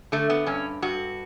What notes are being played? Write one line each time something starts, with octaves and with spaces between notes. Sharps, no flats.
D3 A3
B3
G2 C#4
G2 F#4